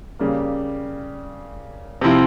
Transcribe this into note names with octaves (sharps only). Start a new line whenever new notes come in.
C#3 G3 A#3
C3 F3 C4 E4